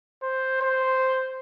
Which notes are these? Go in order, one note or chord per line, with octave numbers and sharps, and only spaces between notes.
C5
C5